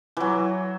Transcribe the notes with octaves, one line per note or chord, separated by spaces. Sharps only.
E3 F#3